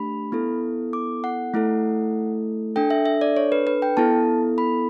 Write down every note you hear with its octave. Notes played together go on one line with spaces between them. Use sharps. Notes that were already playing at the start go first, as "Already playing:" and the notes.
Already playing: A3 D4 G4 B5
B3 E4 A4
D6
F#5
A3 E4 A4
D4 A4 G5
E5
E5
D5
C#5
B4
B4
G5
B3 E4 A4 A5
B5